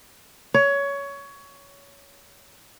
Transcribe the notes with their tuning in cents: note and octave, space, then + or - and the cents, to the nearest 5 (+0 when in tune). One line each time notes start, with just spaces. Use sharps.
C#5 +20